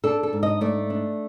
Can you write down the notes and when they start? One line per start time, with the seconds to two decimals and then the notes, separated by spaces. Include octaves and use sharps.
0.04 D4 A4
0.23 A4
0.33 G#2
0.43 D#5
0.61 A3 D5
0.90 D4